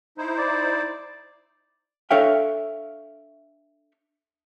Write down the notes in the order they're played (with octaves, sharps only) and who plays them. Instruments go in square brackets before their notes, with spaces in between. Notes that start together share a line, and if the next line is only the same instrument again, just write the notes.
[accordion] D#4 E4 C5
[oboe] D5
[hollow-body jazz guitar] D4 A4 C#5 E5 F5 G5